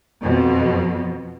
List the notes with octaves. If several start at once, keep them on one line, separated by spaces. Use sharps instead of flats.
F2 B2